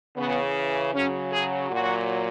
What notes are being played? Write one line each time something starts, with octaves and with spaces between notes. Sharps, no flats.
C#3 E3 B3
C#3 F#3 C#4
G#4
A#2 F#3 F#4